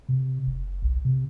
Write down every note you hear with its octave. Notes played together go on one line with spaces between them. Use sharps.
C3
F#1
B1
C3